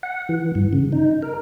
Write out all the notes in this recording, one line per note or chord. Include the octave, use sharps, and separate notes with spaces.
F#5
E3
G2
C#3
D#4
A#4